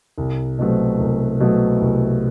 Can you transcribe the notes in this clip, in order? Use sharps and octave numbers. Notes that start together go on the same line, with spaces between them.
C2
B2 F#3 A3 C4
C2
B2 F#3 A3 C4
C2